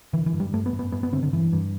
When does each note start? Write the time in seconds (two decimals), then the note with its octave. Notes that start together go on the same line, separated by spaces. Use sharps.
0.13 D3 E3
0.26 E3
0.33 G2
0.40 G3
0.54 G2 A3
0.66 B3
0.73 G2
0.79 B3
0.92 G2 B3
1.03 B3
1.12 D3 C4
1.23 D3
1.33 G2 E3
1.53 G2